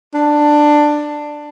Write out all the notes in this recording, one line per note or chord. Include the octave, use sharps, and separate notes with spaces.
D4